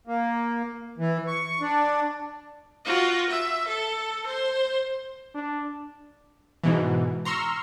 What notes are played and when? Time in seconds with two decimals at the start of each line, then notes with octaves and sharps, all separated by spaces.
0.07 A#3
0.98 E3
1.27 C#6
1.61 D4
2.85 F4 F#4
3.29 E5
3.67 A4
4.26 C5
5.35 D4
6.64 G#2 B2 E3
7.25 A#5 C6 C#6 E6 F6